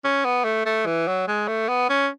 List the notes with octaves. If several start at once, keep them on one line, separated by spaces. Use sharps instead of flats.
C#4
B3
A3
A3
E3
F#3
G#3
A3
B3
C#4